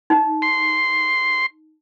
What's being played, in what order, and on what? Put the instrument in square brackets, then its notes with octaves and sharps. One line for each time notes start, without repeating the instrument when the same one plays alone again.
[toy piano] D#4
[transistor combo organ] C6